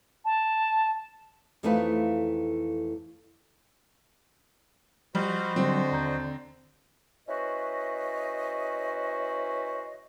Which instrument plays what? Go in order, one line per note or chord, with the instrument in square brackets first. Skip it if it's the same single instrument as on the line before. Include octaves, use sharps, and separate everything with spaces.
[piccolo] A5
[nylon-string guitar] F2 E3 A3 D#4 F4 B4
[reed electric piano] F3 [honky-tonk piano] G3 [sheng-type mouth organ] F#4 C5 D#5
[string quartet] D3 [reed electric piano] F#3 G3 [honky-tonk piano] C4
[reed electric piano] D#2 A#5 G6
[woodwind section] C#4 E4 F#4 B4 C5 D#5